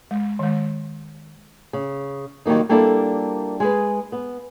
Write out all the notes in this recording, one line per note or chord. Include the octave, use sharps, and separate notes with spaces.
G#3
D#3 G#3
C#3
D#3 F#3 G3 A#3 D#4
G3 A#3 D4 E4 F4 A4
G#3 G#4 B4
B3